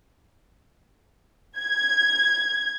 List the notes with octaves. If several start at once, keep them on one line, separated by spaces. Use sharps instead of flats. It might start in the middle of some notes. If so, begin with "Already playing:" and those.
G#6